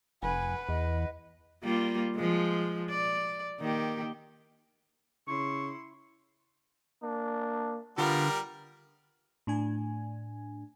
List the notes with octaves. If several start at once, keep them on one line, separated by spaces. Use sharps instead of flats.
F1 B4 F#5 G#5
E2 D#5
G3 A#3 F4
F3 G#3
D5
D#3 A#3 G4
C#3 E4 C6 C#6
A#3 D4
D3 G3 B3 F4 A#4
A2 D4 G#5